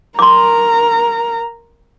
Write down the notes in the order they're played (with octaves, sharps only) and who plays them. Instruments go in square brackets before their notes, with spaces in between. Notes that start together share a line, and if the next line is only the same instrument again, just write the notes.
[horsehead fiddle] A#4 A#5 [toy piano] C6 D6